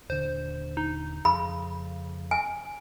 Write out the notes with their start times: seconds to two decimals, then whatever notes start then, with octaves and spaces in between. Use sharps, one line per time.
0.10 D#1 D3 C5
0.77 D#4
1.25 F2 C#3 B5
2.31 G#5